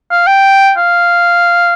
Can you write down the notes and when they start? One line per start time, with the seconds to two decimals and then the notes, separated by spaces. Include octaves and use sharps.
0.11 F5
0.27 G5
0.78 F5